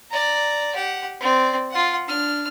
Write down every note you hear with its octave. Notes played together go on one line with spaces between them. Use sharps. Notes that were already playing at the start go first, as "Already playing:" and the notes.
D5 A#5
G4 F#5
C4 D5
F4 F#5
D4 F6